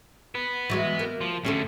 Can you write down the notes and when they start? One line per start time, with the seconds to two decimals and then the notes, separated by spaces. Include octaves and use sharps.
0.35 B3 B4
0.70 E3 F#3 G#3
0.99 A#3
1.21 F3
1.45 A2 D3 C#4 G#4 A4